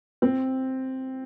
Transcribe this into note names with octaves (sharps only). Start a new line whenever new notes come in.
C4